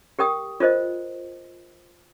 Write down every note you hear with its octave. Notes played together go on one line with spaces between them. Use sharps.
G4 A#4 G5 D#6
F4 A#4 C5 D#5